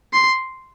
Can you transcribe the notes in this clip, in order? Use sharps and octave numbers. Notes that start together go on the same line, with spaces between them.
C6